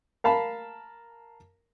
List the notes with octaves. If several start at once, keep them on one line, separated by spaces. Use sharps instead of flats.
A#4 F5 A5 B5